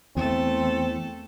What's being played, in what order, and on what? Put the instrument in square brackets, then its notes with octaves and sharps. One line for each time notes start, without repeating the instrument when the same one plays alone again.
[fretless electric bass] E2 [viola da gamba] A3 A4 [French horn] C4